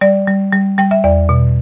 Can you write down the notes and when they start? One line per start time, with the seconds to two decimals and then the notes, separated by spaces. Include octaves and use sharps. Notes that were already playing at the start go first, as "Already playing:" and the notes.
0.01 G3 D5
0.27 G3
0.53 G3
0.78 G3 G5
0.91 E5
1.04 E2 D5
1.29 B2